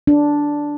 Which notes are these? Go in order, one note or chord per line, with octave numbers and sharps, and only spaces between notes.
D4